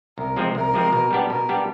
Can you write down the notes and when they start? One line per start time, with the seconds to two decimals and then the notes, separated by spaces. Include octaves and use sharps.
0.18 C2 A#4
0.36 C3 F3 G#3 C4
0.55 C2 A#4
0.74 C3 F3 G#3 C4
0.93 B2
1.11 G3 B3 D4 G4
1.29 B2 A#4
1.49 G3 B3 D4 G4